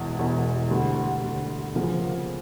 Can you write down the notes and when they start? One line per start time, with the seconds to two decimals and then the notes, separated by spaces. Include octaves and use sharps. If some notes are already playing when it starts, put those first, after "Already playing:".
Already playing: E1 E2 E3
0.17 E1 E2 E3
0.70 D2 D3 G3
1.23 D2 D3 G3
1.75 D2 C#3 F3 A#3